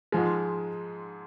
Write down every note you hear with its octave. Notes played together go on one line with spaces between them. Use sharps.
G#2 F3 G#3